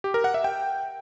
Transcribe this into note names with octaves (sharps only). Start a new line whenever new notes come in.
G4
A#4
F#5
E5
G5